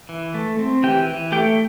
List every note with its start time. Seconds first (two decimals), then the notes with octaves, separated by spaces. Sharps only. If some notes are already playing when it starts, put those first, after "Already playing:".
0.09 E3
0.34 A3
0.59 C4
0.83 E3 G4 G5
1.07 E3
1.32 A3 G4 G5